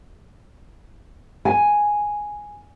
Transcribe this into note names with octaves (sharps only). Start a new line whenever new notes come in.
G#5